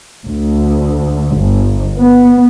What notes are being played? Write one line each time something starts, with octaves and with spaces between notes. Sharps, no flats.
D2
G1
B3